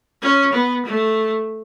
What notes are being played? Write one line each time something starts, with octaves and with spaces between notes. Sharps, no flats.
C#4
B3
A3